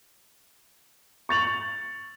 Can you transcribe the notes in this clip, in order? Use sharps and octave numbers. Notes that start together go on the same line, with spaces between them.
C#6 A6 F7 F#7